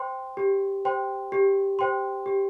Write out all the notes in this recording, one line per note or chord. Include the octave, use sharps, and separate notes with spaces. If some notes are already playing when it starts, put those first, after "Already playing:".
Already playing: C5 G5 C6
G4
C5 G5 C6
G4
C5 G5 C6
G4